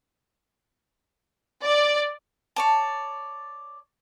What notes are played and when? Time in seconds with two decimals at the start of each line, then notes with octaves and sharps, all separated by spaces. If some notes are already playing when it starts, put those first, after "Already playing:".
1.62 D5
2.56 C#5 D5 A5